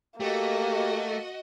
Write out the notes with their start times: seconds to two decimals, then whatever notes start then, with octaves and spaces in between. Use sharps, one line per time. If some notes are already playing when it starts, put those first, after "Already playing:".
0.20 A3 A#3 F#4 G4 D#5 F#5